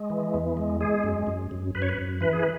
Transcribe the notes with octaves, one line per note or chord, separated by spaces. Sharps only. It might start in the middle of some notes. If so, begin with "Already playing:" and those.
Already playing: G#3
E3
E2
G#3
G#3 G#4
F#2
F#2
F#2
F#2 B4
C#5
B4
F#2
E3 B4
G#4
B4